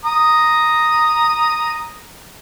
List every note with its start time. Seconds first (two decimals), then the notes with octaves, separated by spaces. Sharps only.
0.05 A#5 D#6